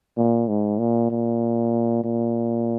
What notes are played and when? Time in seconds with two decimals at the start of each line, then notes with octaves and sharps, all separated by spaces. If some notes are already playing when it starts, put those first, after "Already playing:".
0.17 A#2
0.48 G#2
0.79 A#2
1.11 A#2
2.04 A#2